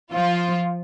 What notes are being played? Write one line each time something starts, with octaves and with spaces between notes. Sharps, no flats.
F3 F4